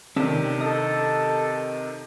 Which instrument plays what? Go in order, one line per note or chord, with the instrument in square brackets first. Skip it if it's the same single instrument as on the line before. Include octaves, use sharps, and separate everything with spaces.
[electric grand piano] C3 D#3 [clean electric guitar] C#4 D4 A4
[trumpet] A4 [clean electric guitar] D#5